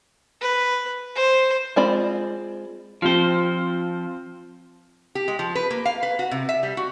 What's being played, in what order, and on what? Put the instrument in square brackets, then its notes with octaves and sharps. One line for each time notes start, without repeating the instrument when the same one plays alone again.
[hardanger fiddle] B4
C5
[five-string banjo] G#3 C4 F4 D5 B5
[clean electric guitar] F3 C5 [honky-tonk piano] C4 F4
[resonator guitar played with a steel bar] G4
G#3
F3
B4
A#3
F5
B4
F#4
C3
E5
G3
F#4